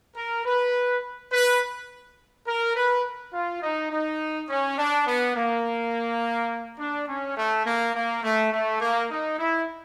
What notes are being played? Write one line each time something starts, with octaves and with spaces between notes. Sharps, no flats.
A#4
B4
B4
A#4
B4
F4
D#4
D#4
C#4
D4
B3
A#3
D4
C#4
A3
A#3
A#3
A3
A3
A#3
D#4
E4